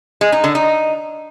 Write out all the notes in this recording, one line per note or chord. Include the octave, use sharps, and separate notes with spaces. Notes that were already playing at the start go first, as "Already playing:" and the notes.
G#3
D#4
D3
D#4